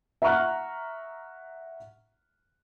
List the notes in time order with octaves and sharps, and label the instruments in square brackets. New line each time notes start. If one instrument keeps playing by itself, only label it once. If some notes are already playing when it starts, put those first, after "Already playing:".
[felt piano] E5 F#5 A#5 C#6 F6 F#6